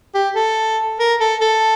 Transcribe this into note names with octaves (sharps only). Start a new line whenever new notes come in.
G4
A4
A#4
A4
A4